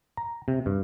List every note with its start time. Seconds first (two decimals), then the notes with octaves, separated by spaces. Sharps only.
0.17 A#5
0.48 C3
0.66 G2